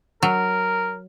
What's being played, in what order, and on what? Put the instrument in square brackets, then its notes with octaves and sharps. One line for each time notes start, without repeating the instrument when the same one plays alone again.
[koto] F#3 [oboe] A#4